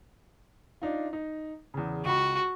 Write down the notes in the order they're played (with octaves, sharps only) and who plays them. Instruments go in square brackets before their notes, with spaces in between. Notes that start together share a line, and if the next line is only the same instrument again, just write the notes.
[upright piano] D4 D#4 F4
D#4
E2 C#3
[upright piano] C#2 B5 [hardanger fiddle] F#4